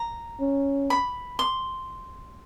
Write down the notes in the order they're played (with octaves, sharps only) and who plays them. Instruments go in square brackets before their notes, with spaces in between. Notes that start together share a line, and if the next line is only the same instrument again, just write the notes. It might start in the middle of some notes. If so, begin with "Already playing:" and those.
Already playing: [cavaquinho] A#5
[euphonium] C#4
[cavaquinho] B5
C6